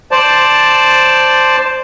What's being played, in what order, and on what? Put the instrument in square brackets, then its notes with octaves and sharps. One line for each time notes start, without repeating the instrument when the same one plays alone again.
[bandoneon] C5 D5 A5